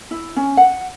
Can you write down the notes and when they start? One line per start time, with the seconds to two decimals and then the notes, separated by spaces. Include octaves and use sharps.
0.11 E4
0.36 C#4
0.57 F#5